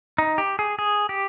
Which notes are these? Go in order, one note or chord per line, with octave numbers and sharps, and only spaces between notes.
D#4
G4
G#4
G#4
G4